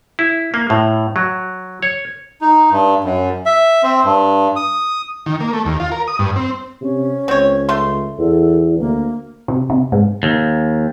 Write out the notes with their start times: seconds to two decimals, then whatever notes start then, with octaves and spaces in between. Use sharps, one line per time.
0.19 E4
0.54 A#3
0.70 A2
1.16 F#3
1.83 C#5
2.41 D#4
2.71 G2
3.04 F#2
3.46 E5
3.83 C4
4.04 G2
4.56 D#6
5.26 D#3
5.40 A#3
5.53 A3
5.65 D#2
5.80 F4
5.92 A#4
6.08 D#6
6.19 G2
6.36 C4
6.81 C3 C#4
7.28 C#2 C4 C#5
7.69 A3 C6
8.18 E2 A4
8.78 D2 A#3
9.48 C3
9.70 C3
9.92 G#2
10.23 D#2